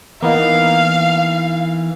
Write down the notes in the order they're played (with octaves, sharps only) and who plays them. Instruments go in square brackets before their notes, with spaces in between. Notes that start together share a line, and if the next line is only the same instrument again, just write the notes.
[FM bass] E3 [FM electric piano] A#3 B3 D#4 [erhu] F5